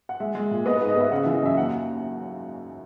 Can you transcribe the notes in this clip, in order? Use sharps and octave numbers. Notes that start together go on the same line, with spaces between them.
F#5
G#3 E5
G#3
A#2
B3 D#5
B4
G#2
D#5
B3 E5
C#3 F#5
E5
E3
D#5
F#2 E5
D#2 F#5